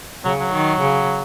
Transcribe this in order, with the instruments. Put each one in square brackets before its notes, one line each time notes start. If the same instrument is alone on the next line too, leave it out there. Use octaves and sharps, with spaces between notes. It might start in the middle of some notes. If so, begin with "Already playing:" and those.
[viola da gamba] C#3 [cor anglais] F#3
[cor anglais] F#3
[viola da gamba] D#3
C#3